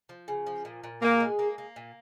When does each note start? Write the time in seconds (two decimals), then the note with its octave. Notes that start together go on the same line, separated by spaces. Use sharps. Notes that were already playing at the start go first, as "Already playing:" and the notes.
0.09 F3
0.28 C#3
0.47 F3
0.65 A#2
0.84 A#2
1.01 A#3 G#4
1.20 G#3
1.39 A#3
1.58 A#3
1.76 A#2